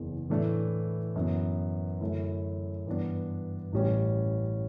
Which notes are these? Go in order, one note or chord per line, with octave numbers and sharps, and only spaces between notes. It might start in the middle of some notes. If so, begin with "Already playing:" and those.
Already playing: F#1 E2 C#3
A2 E3 A3 D4
F#2 E3 B3
F#2 D3 A3 C#4 E4
G2 E3 B3 D4
A1 A2 G3 C#4